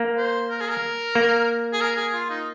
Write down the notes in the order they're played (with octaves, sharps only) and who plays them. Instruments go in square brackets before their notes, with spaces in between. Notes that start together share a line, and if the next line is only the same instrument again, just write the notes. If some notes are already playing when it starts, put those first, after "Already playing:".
Already playing: [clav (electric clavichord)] A#3
[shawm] C5
A#4
G#4
A#4
[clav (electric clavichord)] A#3
[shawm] G#4
A#4
G#4
F4
D#4